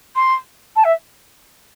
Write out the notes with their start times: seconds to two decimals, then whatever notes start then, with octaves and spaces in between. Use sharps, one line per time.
0.15 C6
0.75 A5
0.84 E5